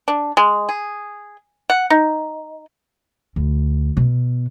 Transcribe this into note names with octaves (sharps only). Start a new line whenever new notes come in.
D4
G#3
G#4
F#5
D#4
D2
B2